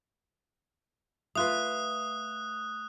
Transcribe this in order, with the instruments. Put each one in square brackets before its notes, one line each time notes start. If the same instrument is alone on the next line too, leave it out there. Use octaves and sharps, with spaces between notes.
[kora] A3 F4 B4 [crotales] D#6 F#6